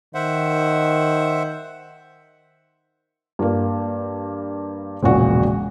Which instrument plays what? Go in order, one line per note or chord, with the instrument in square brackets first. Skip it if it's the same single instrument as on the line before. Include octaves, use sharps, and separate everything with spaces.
[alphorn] D#3 [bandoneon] C5 E5 F#5
[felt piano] G2 A#3
E1 A#1 C#3 F#4